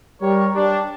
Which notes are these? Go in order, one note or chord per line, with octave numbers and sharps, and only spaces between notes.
G3 A#4 C#5
G3 D4